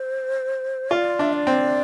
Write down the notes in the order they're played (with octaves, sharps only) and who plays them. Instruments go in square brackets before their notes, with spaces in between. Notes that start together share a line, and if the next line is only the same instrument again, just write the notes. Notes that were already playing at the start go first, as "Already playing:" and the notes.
Already playing: [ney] C5
[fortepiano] F4 [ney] D5
[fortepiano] D4 [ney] E5
[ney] D5
[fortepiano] C4